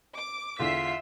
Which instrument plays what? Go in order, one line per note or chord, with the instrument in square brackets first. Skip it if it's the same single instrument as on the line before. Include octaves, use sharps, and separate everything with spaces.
[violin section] D6
[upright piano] E2 D3 [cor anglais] F4 [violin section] E5 B6 C7